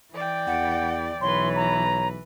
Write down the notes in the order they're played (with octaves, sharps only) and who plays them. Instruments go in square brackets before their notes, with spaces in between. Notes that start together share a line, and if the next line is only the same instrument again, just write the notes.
[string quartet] E3 D5 G5
[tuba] E2 [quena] F#5
[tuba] B1 [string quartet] E3 B4 [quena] C#5 [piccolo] C6
[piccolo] A#5